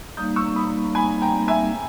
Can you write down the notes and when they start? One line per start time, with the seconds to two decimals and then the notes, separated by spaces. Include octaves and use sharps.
0.17 G3 A#3 D#4 D#6 G6
0.36 C#6 E6
0.56 B5 D#6
0.95 G#5 B5
1.22 G5 A#5
1.48 E5 G#5